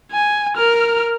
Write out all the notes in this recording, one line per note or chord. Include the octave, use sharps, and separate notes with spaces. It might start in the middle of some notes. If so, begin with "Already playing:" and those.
G#5
A#4 F6